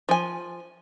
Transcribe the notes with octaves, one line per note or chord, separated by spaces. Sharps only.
F3 G#5